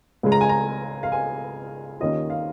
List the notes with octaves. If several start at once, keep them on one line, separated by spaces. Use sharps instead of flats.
C#2 C#3 G#3
A#5
G#5
A#5
F5
G#5
D#2 D#3 C#4 F4 D#5
F5